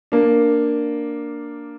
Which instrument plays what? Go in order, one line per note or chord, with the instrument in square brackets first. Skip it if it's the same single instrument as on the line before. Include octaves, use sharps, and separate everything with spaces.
[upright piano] A#3 D4